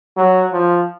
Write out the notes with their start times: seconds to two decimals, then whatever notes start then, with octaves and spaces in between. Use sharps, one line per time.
0.17 F#3
0.52 F3